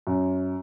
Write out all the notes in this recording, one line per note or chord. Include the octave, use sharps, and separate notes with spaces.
F#2